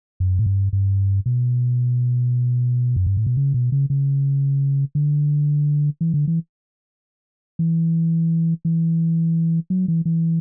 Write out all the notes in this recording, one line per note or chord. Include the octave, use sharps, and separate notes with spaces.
F#2
A2
G2
G2
B2
F#2
G2
A2
B2
C#3
B2
C#3
C#3
D3
E3
D3
E3
E3
E3
F#3
E3
E3